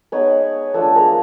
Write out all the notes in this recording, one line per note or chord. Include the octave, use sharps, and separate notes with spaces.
G#3 B3 D#4 B4 C#5
F3 A3 D4 F4 A4 B4
G#4 A#4